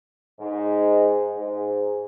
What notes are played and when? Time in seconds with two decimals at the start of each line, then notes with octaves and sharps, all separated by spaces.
0.40 G#2
1.35 G#2